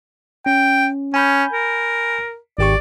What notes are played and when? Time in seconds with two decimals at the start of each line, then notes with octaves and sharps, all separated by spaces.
0.46 C#4 G5
1.14 C#4 G#5 B5 G6
1.53 A#4
2.58 G#1 G4 D5 C#6